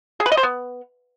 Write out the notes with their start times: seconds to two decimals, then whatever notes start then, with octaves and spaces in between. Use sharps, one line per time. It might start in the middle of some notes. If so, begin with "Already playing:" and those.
0.20 G#4
0.26 B4
0.32 D#5
0.37 C5
0.43 B3